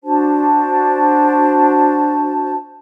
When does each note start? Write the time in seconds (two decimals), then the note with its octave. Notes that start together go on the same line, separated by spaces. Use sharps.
0.04 D4 F#4 C5 A5